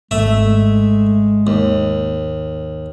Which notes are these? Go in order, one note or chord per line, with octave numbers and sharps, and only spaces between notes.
G#1 G#3 A3 E5
D#2